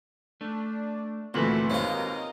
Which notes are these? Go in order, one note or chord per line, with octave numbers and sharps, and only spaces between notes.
A3 D4
D2 A#2 E3 C4 F#4 A4 B4
G#1 D#2 C#4 F4 A#4 D#5